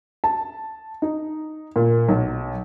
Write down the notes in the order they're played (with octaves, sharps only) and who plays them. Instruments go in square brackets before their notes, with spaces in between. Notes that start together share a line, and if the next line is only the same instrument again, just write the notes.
[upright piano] A5
D#4
A#2
B1